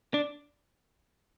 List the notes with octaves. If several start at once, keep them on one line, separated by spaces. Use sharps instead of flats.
D4